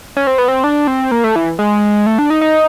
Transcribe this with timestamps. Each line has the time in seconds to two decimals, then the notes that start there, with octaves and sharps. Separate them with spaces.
0.17 C#4
0.27 C4
0.38 B3
0.48 C4
0.64 D4
0.87 C4
1.11 A#3
1.24 A3
1.36 E3
1.59 G#3
2.06 A3
2.18 D4
2.30 D#4
2.41 D#4